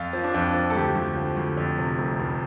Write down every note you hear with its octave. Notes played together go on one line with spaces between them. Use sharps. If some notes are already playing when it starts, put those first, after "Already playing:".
Already playing: F2 F4
F3
D4
F2 F4
F3
A4
D2 G4
D2
F3
D2
F2
C3
F1
F1